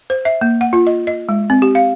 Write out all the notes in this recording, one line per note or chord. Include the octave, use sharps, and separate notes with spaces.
C5
E5
A#3
F#5
F4
D#5
D#5
G#3
C4
G4
F5